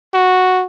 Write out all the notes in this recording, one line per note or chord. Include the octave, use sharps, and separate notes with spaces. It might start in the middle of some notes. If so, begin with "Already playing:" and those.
F#4